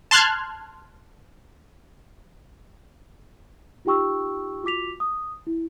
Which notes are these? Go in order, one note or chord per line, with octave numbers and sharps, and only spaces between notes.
A5 C6 F6 F#6 G#6
D#4 F4 G4 G5 C#6 E6
F4 F#4 D6 B6 F7
D#6
E4